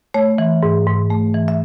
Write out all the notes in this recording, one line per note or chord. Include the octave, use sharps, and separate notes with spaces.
A3 C#5
E3
G#2
G#2
A3
E3
E5